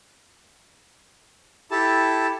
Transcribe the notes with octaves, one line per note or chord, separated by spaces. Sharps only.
E4 G4 A4 A5